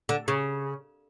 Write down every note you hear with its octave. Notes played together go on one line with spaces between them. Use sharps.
D3
C#3